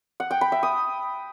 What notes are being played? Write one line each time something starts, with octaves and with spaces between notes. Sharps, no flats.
F#5
G5
B5
E5
D#6